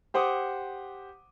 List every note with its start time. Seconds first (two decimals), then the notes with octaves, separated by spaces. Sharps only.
0.14 G4 C5 F#5 D6 D#6